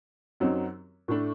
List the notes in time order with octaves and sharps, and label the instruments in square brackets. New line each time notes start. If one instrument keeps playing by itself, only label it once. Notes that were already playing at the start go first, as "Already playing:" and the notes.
[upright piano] F#2 F#3 C4 D#4
A2 A3 D4